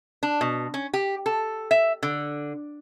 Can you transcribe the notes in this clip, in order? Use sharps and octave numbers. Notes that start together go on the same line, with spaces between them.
D4
B2
C#4
G4
A4
E5
D3